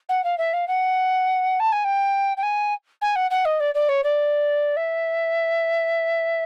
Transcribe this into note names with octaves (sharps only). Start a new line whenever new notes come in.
F#5
F5
E5
F5
F#5
A5
G#5
G5
G5
G#5
G#5
F#5
F#5
D#5
D5
D5
C#5
D5
E5